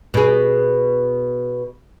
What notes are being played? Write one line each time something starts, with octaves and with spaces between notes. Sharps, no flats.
B2 G#4